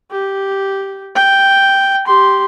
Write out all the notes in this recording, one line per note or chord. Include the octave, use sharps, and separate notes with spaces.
G4
G5
G4 C6